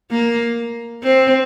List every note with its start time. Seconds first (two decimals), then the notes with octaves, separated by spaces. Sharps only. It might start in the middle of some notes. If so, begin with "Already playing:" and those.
0.11 A#3
1.03 C4